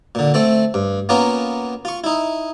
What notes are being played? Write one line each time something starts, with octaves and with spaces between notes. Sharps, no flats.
A#2 D3
A3 C4 A4
G2
A#3 B3 C#4 F4 A#4
F4 C#6
D#4 E4